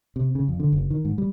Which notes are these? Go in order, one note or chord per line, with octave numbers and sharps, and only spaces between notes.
C3
C#3
F2
D3
F#1
D#3
G#2
G3